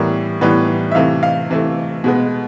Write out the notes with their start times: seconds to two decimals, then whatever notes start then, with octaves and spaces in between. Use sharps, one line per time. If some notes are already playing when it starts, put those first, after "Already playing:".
Already playing: A2 E3 G3 B3 A#4
0.41 A2 E3 G3 B3 B4
0.91 E5
0.95 C3 E3 A3 F5
1.23 F5
1.50 C3 E3 A3
2.04 B2 G#3 B3